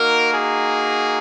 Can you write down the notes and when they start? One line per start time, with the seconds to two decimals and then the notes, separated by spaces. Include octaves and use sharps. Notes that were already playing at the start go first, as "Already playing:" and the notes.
Already playing: A#3 D#4 F#4 A#4
0.34 G#4